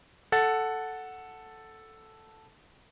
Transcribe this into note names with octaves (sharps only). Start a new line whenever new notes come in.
A4 F#5 A6